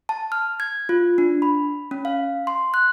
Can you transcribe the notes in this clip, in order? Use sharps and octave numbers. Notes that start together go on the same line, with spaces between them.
A5
F6
G#6
F4
D4
B5
C#4
F5
C6
F#6